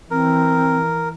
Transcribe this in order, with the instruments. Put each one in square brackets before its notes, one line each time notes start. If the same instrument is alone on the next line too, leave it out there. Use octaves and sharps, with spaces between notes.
[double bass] E3 [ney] C4 [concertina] A#4